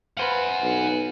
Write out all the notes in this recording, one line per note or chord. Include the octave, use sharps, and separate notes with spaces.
B4 C5 F5 F#5 G#5
B1